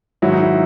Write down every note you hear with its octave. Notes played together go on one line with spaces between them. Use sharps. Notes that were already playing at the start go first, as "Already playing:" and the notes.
G#2 D#3 F#3 E4
D#4
E4